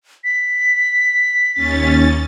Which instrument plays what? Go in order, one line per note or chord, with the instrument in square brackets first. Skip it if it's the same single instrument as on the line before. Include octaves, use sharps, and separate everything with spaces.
[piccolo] B6
[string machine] D#2 C#4 A6